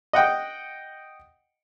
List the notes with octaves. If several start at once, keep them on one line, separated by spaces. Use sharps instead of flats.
D#5 F#5 G5